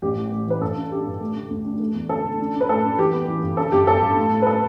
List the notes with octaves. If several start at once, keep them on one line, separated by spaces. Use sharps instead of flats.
A1 G4
A2
A2
E3 B4
G2 A4
D4
D4 G4
G2
A3
D3
D2
D4
A3
E2
D3 A4
D3
D4
D4
B4
A2 A4
D4
E3 G4
B3
E3
G2
D3 A4
G1 G4
G1 A4
G2
A2
A2
B4
A2 A4